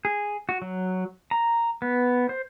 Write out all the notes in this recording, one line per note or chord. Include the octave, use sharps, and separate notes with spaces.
G#4
F#4
F#3
A#5
B3
C5